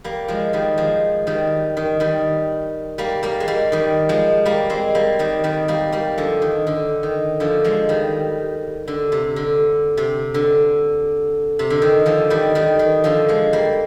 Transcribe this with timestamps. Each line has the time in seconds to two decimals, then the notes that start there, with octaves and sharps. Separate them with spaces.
0.04 G3 A#3
0.28 F3 G#3
0.53 D#3 G3
0.78 F3 G#3
1.27 D#3 G3
1.77 D#3
2.00 D#3 G3
2.98 G3 A#3
3.23 G3 A#3
3.40 G#3
3.48 G3 A#3
3.72 D#3 G3
4.09 F3 G#3
4.46 G3 A#3
4.70 G#3 C4
4.95 G3 A#3
5.19 D#3 G3
5.44 D#3 G3
5.68 G3 A#3
5.92 G3 A#3
6.18 D3 F3
6.42 D#3
6.67 D3
7.03 D#3
7.40 D3 F3
7.64 F3 G#3
7.89 D#3 G3
8.88 D3
9.12 C3
9.36 D3
9.97 C3
10.34 D3
11.59 C3
11.70 D3
11.82 D#3
12.06 D3 F3
12.30 D#3 G3
12.55 D#3 G3
12.79 D#3
13.04 D3 F3
13.29 F3 G#3
13.53 G3 A#3